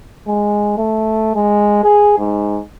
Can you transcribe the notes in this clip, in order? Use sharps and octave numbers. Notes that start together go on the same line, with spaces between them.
G#3
A3
G#3
G#4
G#2